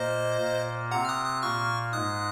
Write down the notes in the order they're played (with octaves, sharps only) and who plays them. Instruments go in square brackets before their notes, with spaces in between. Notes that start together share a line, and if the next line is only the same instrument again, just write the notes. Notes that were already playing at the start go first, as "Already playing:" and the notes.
Already playing: [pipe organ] A#2 A#3 [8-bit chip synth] C5 D#5
[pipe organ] A#2 A#3
[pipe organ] C3 C4 [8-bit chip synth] F#5 A#5
[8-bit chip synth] F6
D#6 F#6
D#6 F#6
[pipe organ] A#2 A#3 [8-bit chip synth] C#6 F6
[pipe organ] G#2 G#3 [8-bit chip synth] D#6 F#6